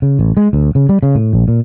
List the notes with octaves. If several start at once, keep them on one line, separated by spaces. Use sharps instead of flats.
C#3
A1
G#3
D2
C#3
G3
C#3
A2
A#1
A#2